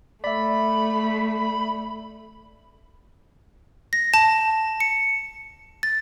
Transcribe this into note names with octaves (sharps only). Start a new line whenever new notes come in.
A3 D5 E5 B5
A#6
A5
C#7
A6